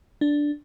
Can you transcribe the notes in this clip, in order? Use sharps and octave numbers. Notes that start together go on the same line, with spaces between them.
D4